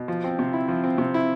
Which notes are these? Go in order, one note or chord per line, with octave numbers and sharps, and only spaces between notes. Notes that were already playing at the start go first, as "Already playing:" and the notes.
Already playing: B2
F3
C4
C3
E4
F3
C4
C3
E4